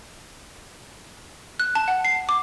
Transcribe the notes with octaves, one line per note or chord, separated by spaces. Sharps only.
F#6
A5
F#5
C7
D6